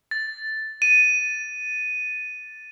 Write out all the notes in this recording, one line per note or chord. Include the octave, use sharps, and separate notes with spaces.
A6
D#7